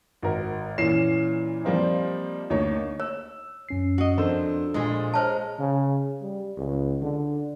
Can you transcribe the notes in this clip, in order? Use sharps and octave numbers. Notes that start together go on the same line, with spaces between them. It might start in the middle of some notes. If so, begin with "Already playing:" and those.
G#1 A#4
A#2 E3 C#4 C7 E7
F3 G3 A#3 C4 D#4
D2 A#3 D#4 C#5
C#5 E6
F#2 C#4 C7
F#4 D#5
F2 D4 A4 A#4 C5 E6
A#1 A#2 G#3 G#4
C5 C#5 D#5 A5 A#5 F6
C#3
G3
C#2
D3